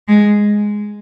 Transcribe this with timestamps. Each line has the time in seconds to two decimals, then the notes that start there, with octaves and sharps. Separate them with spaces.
0.08 G#3